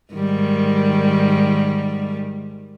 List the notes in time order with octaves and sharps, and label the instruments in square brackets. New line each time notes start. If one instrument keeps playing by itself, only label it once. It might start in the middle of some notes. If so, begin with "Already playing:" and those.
[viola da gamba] G#2 D#3 G3